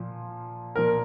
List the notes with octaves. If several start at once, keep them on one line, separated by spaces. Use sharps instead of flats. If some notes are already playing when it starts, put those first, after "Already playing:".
Already playing: A#2 F3
A#2 F3 A#4